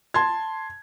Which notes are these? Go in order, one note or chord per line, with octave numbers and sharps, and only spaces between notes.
A5 C6 G#6